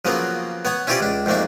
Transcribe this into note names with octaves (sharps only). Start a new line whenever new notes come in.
C#3 F3 F#3 A#3 B3
B3 C#5 F#5
C#4 E4 F4 G4 C5 D5
C#2 D4
F2 G#2 A3 A#3 D4